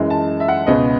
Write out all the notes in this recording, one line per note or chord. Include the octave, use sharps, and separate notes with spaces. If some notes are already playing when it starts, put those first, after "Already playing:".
Already playing: F#2 E3 G#3
A5
E5
F#5
C#2 B2 G#3 B3 D#5